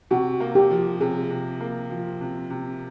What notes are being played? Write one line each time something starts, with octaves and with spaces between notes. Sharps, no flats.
C3 F#4
A#3
G4
F3
C3 G#4
C3
A#3
F3
C3
C3